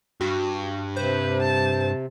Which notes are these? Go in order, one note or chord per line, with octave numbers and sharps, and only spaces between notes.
G2 F#4
C3 B4 C5
A5